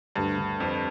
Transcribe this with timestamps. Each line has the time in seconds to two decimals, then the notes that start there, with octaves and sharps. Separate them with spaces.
0.16 D2 G2
0.38 D3
0.60 F2 C4